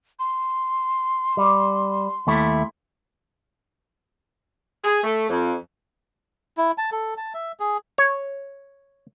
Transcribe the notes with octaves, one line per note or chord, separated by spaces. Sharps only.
C6
G3
D#2 A3 E4
G#4
A3
F2
E4
A5
A4
A5
E5
G#4
C#5